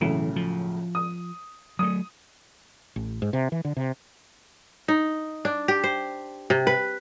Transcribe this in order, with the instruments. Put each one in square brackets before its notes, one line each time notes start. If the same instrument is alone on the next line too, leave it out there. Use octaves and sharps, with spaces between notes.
[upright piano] B1 A2 C#3 [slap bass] E3
[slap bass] F3
[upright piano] D#6
[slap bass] F#3 A3 [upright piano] D#6
[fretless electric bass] A1
G#2
C3
E3
D3
C3
[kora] D#4
D4
G4
C5
C3
B4